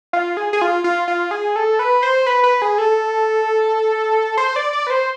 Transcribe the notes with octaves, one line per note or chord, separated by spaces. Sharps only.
F4
G#4
G#4
F4
F4
F4
G#4
A4
B4
C5
B4
B4
G#4
A4
C5
D5
D5
B4
C5